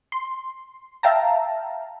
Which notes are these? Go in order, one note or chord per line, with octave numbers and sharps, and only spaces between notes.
C6
E5 F5 G5 A5 A#5